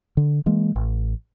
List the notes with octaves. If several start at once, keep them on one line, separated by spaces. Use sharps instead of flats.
D3
E3 G#3 A#3
A1